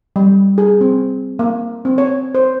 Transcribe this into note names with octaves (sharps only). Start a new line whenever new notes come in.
G3
G#4
C4
A#3
C4
C#5
C5